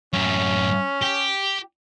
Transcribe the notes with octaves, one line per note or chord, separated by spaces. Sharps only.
F#2 A2 C#4
G4